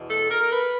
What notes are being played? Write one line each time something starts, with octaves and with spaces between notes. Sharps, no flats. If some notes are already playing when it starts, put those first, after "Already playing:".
Already playing: E2 B2
A4
A#4
B4